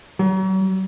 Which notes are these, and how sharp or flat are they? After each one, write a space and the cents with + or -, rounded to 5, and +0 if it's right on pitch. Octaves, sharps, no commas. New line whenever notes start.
F#3 +40